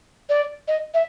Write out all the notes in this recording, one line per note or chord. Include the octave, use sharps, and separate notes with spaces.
D5
D#5
E5